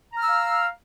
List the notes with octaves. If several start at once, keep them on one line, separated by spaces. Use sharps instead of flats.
F5 A#5 E6 F6